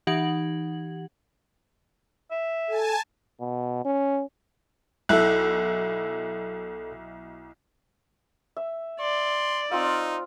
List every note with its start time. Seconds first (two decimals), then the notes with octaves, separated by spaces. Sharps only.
0.07 E3 D#4 G4 F#5 G#6 F#7
2.31 E5
2.69 A4 G#5 A5
3.40 B2
3.85 C#4
5.09 B1 E4 A4 F#6
8.57 E5
9.01 D5 C6
9.71 C4 D#4 F4 F5